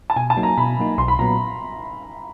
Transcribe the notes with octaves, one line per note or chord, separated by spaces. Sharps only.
A5
B2 G#5
A5
F#3 A#3 D#4
A#5
B2 B5
F#3 A#3 D#4
B1 C6
B5
A#2 F#3 B3 A#5